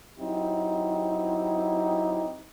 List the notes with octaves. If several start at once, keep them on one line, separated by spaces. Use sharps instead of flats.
F#3 C4 D#4 E4 G4